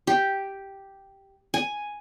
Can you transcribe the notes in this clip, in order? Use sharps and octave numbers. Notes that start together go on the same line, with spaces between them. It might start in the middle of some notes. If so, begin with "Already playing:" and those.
G4
G#5